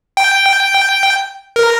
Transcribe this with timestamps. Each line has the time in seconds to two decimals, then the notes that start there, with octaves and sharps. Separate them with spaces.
0.17 G5
1.56 A#4